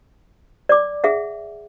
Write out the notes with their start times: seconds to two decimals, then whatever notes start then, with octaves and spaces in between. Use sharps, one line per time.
0.69 D5 D6
1.04 G#4 E5 F#5